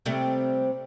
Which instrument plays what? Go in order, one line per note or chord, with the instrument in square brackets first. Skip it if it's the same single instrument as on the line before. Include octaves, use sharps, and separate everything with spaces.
[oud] C3 G3 A3